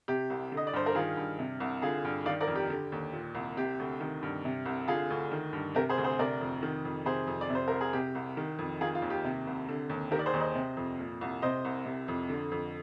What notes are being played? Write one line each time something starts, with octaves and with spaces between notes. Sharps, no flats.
C3 G4
C2
D3
D#5
D5
G2 C5
A#4
D#3 F4 G#4
G2
C3
C2
D3 F4 G#4
G2
D#3 D5 F5
A#4 D5
F2
G4
D3
D#2
A#2
C2
C3 G4
D2
D#3
G2
C3
C2
D3 F4 G#4
D2
D#3
G2
C3 G4 A#4
G#4 C5
D2
G#4 C5
C3 A#4 D5
F2
D#3
F2
C3 G#4 C5
F2
D5
C3
C5
C2 A#4
G#4
C3 G4
C2
D#3
F2
D#3 F4 G#4
F4
D#2
G4
C3
C2
D3
D#2
D#3 G4 A#4
D5
G#4 C5
D#2
C5 D#5
C3
F2
A#2
C2
C3 C5 D#5
C2
C3
F2
D3
F2